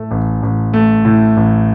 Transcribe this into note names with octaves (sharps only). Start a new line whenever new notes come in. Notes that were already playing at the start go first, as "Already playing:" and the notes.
Already playing: A2 A3
A1
A1
A3
A2
A1